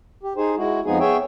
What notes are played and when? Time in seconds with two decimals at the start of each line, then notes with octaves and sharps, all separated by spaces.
0.23 G4
0.37 D#4 G#4 C5
0.57 G#3 E4 F#4
0.85 F2 F3 G#3 B3 D#4 G#4
1.00 B3 G#4 C#5 E5 G5